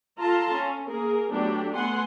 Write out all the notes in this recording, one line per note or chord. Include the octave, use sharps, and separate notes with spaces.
F4 A4 F5 A5 A#5 C6
C#4
A#3 G#4 A#4
F#3 A3 B3 D4 F#4 G4
A3 B3 F#5 G#5 C6